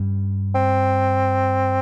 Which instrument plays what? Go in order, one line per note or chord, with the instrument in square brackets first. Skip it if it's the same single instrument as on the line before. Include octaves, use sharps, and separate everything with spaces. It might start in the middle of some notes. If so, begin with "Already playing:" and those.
Already playing: [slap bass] G2 G3 C#4
[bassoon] C4